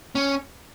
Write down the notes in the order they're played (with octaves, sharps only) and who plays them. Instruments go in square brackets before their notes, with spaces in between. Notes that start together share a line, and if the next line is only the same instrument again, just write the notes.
[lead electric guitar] C#4